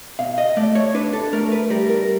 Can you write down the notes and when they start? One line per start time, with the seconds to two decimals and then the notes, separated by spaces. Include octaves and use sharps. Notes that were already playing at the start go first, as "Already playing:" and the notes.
0.19 B2 F5
0.38 D#5
0.57 A3 D5
0.75 C#5
0.94 D4 B4
1.13 A4
1.33 A3 A#4
1.52 B4
1.70 G3 A#4
1.90 A#4